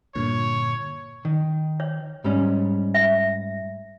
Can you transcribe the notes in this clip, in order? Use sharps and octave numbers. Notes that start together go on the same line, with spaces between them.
G2 A#2 D3 C#5
D#3
C#5
G#2 G3 C#4
E5